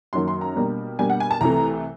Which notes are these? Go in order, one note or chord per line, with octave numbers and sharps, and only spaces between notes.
F#2 D#3 F#3 A#3 C6
C6
A#5
B2 G3 A#3 D4
B2 G3 A#3 D4 G#5
F#5
G#5
A5
C2 C3 E3 A3 A#5